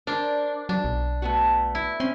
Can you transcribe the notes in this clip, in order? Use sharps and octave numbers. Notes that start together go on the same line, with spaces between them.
D4 A#4 C5 D5
F#3 D4
B1
A3 B3 F#4
E4
C4 C#4 C6